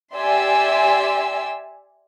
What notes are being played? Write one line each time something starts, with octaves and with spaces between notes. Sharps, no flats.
G4 D5 E5 G#5 C6 E6